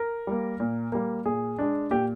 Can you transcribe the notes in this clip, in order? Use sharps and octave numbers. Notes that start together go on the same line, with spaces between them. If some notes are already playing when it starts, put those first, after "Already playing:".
Already playing: A#4
G3 A#3
A#2
G3 A#3
A#2 G#4
G#3 D4
A#2 G4